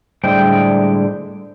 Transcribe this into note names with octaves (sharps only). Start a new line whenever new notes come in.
A2 D3 G3 G#3 C5 G5